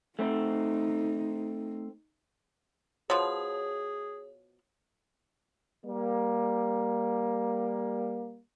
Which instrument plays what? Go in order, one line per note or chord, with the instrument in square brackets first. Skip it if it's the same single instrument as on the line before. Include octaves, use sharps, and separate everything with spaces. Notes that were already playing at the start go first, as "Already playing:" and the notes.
[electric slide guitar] A3 C4 [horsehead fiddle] D#4
[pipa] B2 F3 [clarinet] G#4 [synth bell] C#5
[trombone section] G3 A#3